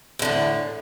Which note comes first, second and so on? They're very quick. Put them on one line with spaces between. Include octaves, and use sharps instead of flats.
E2 D3 A2